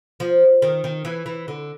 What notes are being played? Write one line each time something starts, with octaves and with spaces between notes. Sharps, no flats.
F3
D#3
D#3
E3
E3
D3